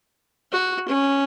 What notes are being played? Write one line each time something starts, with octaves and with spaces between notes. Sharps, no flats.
F#4
C#4